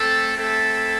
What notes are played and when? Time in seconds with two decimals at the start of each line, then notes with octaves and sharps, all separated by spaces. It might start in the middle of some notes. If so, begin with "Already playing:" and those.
Already playing: A3 C4 A4
0.36 A3 C4 E4 A4 E5